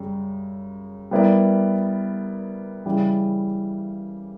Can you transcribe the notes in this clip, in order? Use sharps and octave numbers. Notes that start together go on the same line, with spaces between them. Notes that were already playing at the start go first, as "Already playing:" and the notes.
Already playing: F#2 C#3 G3
G3 B3 E4 A#4 D5
C#3 E3 G3